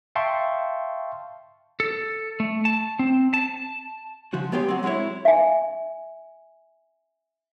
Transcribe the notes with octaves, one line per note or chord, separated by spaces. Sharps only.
E5 F5 G5 A5 C6 C#6
A4
A3
A5
C4
A5
C#3 F3 F#4
G#3 B3 G4 C#5 C6
F#3 C4
F#3 G#3 C4 E4 C#5
E5 G#5